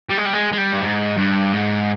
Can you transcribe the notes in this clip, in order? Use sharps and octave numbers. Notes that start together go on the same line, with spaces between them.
G3
G#3
G3
G#3
G#3
G3
G2
G#2
G2
G#2